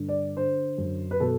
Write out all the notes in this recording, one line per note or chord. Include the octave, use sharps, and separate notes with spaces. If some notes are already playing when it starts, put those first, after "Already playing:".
Already playing: G2 D3
D5
D3 C5
F#2
B4
B2 A4